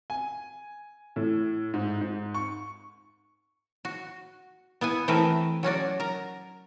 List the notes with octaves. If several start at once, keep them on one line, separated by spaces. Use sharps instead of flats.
G#5
A2
G#2
G#2
C#6
F#4
B3 E4 F#5 G#5
E3 A3 C4 A#4 B4 E5
F#3 C#4 F#4 D5
A#4 A#5